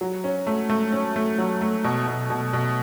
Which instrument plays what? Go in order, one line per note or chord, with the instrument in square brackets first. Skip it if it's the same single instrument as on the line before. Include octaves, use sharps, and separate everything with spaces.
[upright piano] F#3
C#4
A3
A3
C#4
A3
F#3
A3
B2
B2
B2
B2